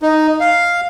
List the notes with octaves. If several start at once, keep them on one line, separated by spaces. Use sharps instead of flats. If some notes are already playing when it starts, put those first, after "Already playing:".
D#4
F5